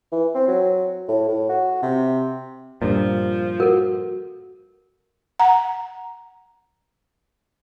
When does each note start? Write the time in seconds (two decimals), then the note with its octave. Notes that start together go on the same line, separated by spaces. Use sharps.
0.12 E3
0.35 C4
0.48 F#3
1.08 A2
1.28 A2
1.49 F#4
1.83 C3
2.82 G2 A#2 F3
3.60 F#4 A4 A#4
5.39 F#5 A#5